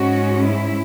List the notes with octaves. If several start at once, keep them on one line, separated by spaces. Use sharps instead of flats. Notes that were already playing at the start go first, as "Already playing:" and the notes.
Already playing: G#2 G#3 C#4 F#4
E4